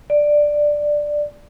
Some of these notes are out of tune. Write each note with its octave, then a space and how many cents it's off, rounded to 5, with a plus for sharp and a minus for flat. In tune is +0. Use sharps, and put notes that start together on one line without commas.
D5 +5